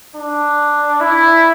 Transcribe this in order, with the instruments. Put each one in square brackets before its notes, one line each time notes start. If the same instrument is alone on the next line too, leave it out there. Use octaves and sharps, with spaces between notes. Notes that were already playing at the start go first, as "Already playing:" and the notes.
[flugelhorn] D4
E4